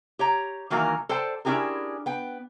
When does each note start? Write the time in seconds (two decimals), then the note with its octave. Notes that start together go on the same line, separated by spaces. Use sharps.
0.19 G4 C#5 A#5
0.70 D#3 E3 F#3 A#3 F#4 A#4
1.09 A4 C5 D5 G5 A5
1.45 C#4 D4 E4 G4 G#4 A#4
2.06 B3 G5